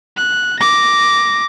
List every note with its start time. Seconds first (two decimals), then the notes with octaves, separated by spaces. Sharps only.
0.17 F#6
0.59 D6 A#6